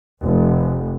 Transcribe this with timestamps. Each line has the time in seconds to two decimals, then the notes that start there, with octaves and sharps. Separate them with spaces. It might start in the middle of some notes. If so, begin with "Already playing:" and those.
0.23 F1